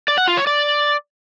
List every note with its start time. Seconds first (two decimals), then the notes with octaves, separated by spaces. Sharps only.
0.08 D5
0.18 F#5
0.27 F4
0.37 C#5
0.47 D5